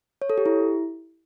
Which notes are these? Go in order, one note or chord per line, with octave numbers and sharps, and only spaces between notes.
C#5
A4
G4
E4